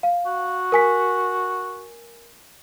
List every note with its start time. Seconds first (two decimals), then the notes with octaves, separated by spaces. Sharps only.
0.03 F5
0.26 F#4
0.72 A#4 G#5 B6